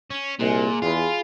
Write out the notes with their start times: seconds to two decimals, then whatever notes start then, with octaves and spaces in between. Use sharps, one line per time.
0.11 C#4
0.40 C2 A#2 G#3
0.82 E2 G3 F4 G#4 B5